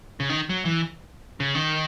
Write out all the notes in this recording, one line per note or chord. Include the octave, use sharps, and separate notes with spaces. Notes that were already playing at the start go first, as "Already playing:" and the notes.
C#3
D#3
F#3
E3
C#3
D#3